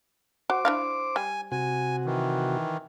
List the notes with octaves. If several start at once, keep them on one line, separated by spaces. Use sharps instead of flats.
F#4 C5 D6
D4 E4 F5
G3 G#5
C3 F#4 G#5
D#3 E3